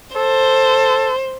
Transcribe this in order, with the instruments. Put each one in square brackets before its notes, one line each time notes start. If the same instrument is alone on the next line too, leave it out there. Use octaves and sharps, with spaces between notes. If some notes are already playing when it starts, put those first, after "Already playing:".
[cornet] A4 [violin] C5